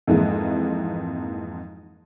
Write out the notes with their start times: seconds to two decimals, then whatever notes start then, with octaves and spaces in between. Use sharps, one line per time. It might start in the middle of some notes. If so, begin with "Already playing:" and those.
0.07 F2 G#2 E3 G#3 A#3